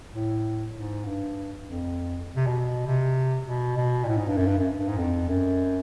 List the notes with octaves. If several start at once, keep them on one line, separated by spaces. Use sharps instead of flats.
A2
G#2
G2
F2
C3
B2
C3
B2
B2
A#2
A2
G#2
G2
F#2
G2
F#2
G2
G#2
F2
F#2